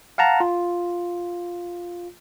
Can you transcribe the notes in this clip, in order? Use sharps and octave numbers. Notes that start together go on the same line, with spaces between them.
F5 F#5 A5 A#5
F4